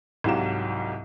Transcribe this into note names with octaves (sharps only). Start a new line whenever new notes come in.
C2 G#2 F#3 G4 F5 E7